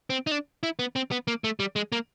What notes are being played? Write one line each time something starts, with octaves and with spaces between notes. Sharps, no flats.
C4
D#4
D4
E4
B3
C4
B3
A#3
A3
G3
G#3
A#3